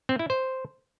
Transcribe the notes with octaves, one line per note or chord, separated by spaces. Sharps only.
C4
E4
C5